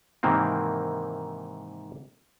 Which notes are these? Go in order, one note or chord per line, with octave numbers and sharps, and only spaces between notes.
G#2 C3 D#3 E3 A#3 C4